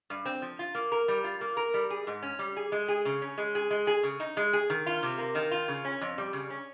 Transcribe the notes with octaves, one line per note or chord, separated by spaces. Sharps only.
G2
C4
F3
F4
A#3
A#4
G3
F4
A#3
A#4
G3
G#4
G#2
C#4
G3
G#4
G#3
G#4
C#3
C#4
G#3
G#4
G#3
G#4
C#3
D#4
G#3
G#4
D#3
F4
C3
A#3
D#3
F4
C#3
C#4
F2
G3
C#3
C#4